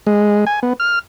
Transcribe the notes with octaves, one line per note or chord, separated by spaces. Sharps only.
G#3
G#5
B3
F6